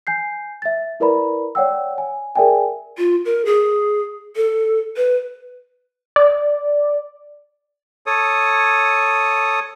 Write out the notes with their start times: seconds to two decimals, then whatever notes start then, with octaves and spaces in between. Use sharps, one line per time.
0.07 G#5 G6 C7
0.62 E5 A6
1.00 E4 A#4 B4 D5 A#5 B5
1.55 C#5 D5 F#5 G5 E6
1.98 G#5
2.35 G#4 A#4 D5 E5 G5 G#5
2.98 F4
3.25 A#4
3.45 G#4
4.36 A4
4.97 B4
6.16 D5
8.06 A4 C#5 D#6